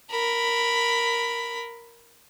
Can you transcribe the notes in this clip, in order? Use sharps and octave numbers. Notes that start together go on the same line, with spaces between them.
A#4 B5